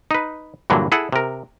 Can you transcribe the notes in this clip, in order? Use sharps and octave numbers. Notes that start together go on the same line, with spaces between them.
D#4 B4
G2 A#2 D3 E3 F#3
E4 G#4 A4 F#5
C3 A#4